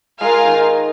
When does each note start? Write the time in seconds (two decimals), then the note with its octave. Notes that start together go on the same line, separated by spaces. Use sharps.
0.21 G#3 F4 A#4 F5 G#5
0.45 D#3